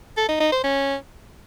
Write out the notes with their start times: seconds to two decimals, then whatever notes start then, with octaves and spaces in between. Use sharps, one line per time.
0.17 A4
0.29 D#4
0.40 D#4
0.52 C5
0.64 C#4